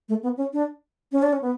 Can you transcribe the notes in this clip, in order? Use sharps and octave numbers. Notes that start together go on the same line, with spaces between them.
A3
B3
C#4
D4
C#4
D4
C#4
B3